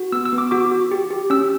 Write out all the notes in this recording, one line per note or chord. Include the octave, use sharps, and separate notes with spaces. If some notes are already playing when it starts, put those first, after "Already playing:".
Already playing: F#4
B3 E6
E6
B3
D6
F#4 D6
F#4
G4
G4
C#4 E6